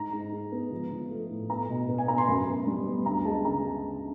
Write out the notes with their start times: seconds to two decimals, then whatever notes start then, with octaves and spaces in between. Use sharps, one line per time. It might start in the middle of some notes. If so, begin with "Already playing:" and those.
Already playing: G#2 A#5
0.13 G#2
0.32 G#3
0.52 B3
0.71 F3
0.91 F3
1.10 A3
1.30 A2
1.49 B3 A#5
1.69 B2
1.89 B3
1.98 G#5
2.08 B3 A#5
2.18 C6
2.27 F#2 B5
2.47 B3
2.67 G3
2.86 B3
3.06 D2 A#5
3.25 G#3 A5
3.45 C#3 A#5